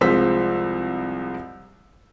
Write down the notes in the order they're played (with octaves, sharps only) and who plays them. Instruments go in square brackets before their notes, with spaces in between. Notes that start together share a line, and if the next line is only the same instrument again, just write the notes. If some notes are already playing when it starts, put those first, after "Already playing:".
[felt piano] C2 F3 G#3 C5 E6 B6